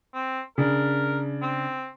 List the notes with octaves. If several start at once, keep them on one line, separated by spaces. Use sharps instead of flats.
C4
C#3 D4 A#4
C4